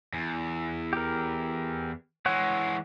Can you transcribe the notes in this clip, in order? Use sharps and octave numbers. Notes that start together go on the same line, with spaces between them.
E2
G4 A#4
E3 G#3 C#5 F#5